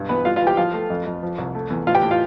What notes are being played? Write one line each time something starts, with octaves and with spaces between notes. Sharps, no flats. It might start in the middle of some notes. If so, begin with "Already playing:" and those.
Already playing: B1 G2
E3 B3 B4
G3 F4 F5
F4 F5
E3 G4 G5
F3 F4 F5
A3
F2
F2
F3
C2
A3
E2
A2 F4 F5
G4 G5
A2
F4 F5